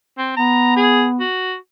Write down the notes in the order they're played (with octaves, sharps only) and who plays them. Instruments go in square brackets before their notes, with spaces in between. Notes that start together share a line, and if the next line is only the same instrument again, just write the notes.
[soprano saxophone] C4
[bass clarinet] B3 [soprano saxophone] A#5
[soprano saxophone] G#4
F#4